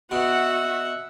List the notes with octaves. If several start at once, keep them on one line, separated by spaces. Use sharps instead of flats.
B2 F#4 E5 F#5